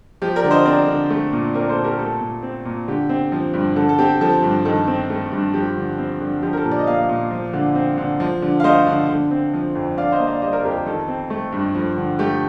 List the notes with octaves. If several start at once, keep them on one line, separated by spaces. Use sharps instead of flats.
F3 G4
A#4 D5
D3
C5 D#5
C4 A#4 D5
D3
A3
A#2
C4 A#4 D5
A4 C5
A#2
G4 A#4
A3 A4
A#2
C4
A#2
D3 G4
C4
F3
G2
D3 A4
A4
C4 G4
F3 A4
G2
D#3 A4
C4
A3
G2
F3 G4
D3
C4
D3
F3 G4
A#4
A4
A#2
D5
D#5
A#3 D5 F5
A#2
F3
D3
C4
D3
F3
D3
F5
A3 C5 D#5
D3
D3
C4
F3
F2
D3 D5 F5
C5 D#5
A#3
D5 F5
G3 C5 D#5
A#4 D5
F2 G4 A#4
D#3 A4
C4
A3
G2
F3
D3
A3 G4